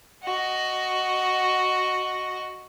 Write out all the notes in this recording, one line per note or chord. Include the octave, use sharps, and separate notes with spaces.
F#4 D#5